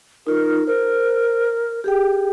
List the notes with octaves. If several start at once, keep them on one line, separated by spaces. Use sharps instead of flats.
D#4 F4 A#4
A#4 C5
G4 G#4 G5